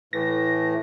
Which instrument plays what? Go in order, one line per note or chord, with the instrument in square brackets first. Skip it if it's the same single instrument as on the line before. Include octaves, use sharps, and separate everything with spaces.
[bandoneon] A2 E3 A3 [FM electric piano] A#6